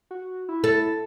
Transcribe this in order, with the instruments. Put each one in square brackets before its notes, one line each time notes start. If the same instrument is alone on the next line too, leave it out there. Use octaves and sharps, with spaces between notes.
[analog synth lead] F#4
E4
[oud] A4